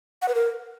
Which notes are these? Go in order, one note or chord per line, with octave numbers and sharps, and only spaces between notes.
F#5
B4
A#4